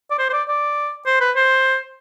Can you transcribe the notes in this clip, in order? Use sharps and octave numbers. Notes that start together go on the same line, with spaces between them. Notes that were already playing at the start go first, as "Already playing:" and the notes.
D5
C5
C5
D5
D5
C5
B4
C5